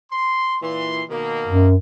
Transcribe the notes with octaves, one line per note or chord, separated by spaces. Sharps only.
C6
A#2 E3 C6
B2 D#3 A#3
F#2